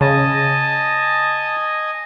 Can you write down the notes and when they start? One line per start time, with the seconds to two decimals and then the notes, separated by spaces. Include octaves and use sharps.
0.01 C#3 D#5 G#5 A5 D#6